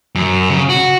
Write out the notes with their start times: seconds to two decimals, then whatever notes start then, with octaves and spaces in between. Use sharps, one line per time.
0.15 F#2
0.50 C#3
0.69 F#4